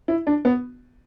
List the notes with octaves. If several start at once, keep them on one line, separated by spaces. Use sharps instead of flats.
E4
D4
B3